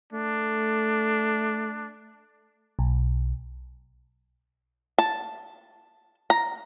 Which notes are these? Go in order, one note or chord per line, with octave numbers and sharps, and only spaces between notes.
A3 D4
B1
A5
A#5